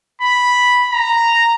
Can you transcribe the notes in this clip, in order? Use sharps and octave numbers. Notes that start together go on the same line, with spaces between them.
B5
A#5